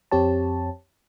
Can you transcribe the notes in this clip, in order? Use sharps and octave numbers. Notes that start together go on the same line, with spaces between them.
F2 C4 G4 C#5 A5